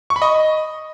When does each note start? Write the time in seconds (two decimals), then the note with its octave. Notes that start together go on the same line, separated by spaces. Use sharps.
0.10 C#6
0.16 B5
0.22 D#5